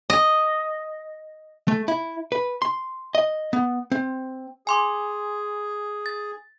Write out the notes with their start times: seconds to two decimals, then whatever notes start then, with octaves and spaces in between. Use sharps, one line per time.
0.10 D#5
1.68 A3
1.88 E4
2.32 B4
2.62 C6
3.15 D#5
3.53 B3
3.92 C4
4.67 G#4 G#5 C6 D6
6.06 A6